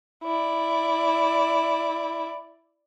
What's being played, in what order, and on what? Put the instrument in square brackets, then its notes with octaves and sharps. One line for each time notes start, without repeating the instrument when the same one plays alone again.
[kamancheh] E4 D5